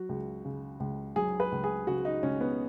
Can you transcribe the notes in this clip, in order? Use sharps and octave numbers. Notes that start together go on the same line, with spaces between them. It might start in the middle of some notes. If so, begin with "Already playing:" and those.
Already playing: F#3 F#4
C#2
C#3
C#2
F#3 G#4
B4
C#2
G#4
C#3 F#4
D#4
C#2 C#4
B3